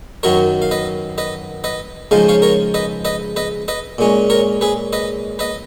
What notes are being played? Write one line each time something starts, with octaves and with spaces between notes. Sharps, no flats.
F#2 D#3 F#3 A#4 C#5
F5
B4 D#5
B4 D#5
B4 D#5
C#3 F3 G#3 D#4 F5
C#5 F5
A#4 C#5
B4 D#5
B4 D#5
B4 D#5
B4 D#5
A#2 G#3 C#4
A#4 C#5
G#4 B4
B4 D#5
B4 D#5